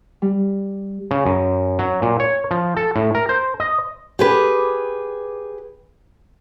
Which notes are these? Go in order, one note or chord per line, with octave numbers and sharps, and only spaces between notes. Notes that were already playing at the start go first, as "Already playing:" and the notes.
G3
C#3
F#2
F#3
A#2
C#5
F3
A4
A2
A#4
C5
D#5
G4 G#4 B4